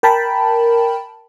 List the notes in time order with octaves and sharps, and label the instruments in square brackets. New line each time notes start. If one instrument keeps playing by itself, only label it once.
[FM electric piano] A#4 G5 A5 B5